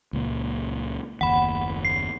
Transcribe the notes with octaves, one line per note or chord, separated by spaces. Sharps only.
C#2 A#2
F#1 D#2 F#5 B5
C7